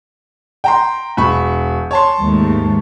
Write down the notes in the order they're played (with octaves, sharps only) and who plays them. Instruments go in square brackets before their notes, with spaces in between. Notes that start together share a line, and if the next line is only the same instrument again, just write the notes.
[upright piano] G5 A#5 C6
E1 B5 C#6
C#5 A5 C6
[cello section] D#2 G#2 A3